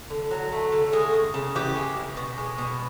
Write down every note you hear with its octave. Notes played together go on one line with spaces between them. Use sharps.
D3
F#3
A3
D3
G#3 G#4
C#3
C#3
E3 G4
G#3
C#3
B2
G#3
B2